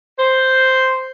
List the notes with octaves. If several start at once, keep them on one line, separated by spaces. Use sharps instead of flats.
C5